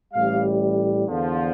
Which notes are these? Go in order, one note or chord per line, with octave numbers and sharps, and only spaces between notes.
A1 A2 G3 F5
E2 D3 F3